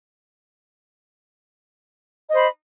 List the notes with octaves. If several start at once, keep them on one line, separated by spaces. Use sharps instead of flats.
C5 D#5 B5